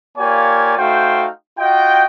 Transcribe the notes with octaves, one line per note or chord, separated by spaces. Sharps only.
A#3 F4 G4 C#5 D5 G#5
A3 D#4 F#4 C5 F5 G5
F4 F#4 D#5 G5